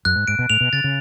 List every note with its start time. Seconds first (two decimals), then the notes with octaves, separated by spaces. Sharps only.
0.05 F#2 F#6
0.16 G#2
0.28 G#2 D7
0.39 B2
0.50 A2 F7
0.61 B2
0.73 C#3 A6
0.84 C#3